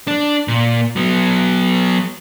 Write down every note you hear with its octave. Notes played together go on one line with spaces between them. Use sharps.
D4
A#2
F#3 B3